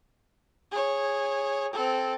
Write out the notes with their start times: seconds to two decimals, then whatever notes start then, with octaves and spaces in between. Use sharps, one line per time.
0.71 G#4 C#5
1.73 C4 A4